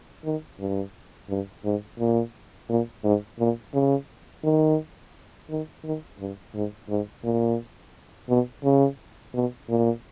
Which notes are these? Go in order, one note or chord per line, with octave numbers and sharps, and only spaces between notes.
D#3
G2
G2
G#2
A#2
A#2
G#2
A#2
C#3
D#3
D#3
D#3
G2
G#2
G#2
A#2
B2
C#3
B2
A#2